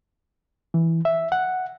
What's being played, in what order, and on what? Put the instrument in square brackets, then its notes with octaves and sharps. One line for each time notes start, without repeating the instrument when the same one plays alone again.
[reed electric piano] E3
E5
F#5